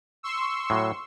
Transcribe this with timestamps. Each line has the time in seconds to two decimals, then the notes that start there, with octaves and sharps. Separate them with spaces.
0.23 C6 C#6 E6
0.70 A2 F#3